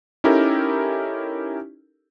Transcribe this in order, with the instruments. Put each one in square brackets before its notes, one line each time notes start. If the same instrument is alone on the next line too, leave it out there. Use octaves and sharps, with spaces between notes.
[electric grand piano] C#4 D#4 E4 G4 A4 A#4